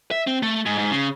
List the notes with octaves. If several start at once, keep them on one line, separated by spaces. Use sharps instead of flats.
E5
C4
A3
G#2
G#2
C#3